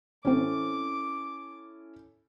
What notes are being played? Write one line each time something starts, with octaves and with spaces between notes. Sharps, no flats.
A1 C4 C#4 E4 A4 D6